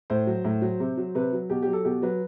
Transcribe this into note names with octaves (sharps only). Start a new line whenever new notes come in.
A2 C5
F#3
A2
F#3
C3
F#3
C3 B4
F#3
B2 G4
G4
F#3
A4
B2 G4
F#3 B4